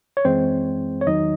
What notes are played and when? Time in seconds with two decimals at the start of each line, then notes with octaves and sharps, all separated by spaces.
0.17 C#5
0.25 F#2 E3 G#3 C4 C5
1.01 C#5
1.06 E2 D#3 F#3 D#4 D#5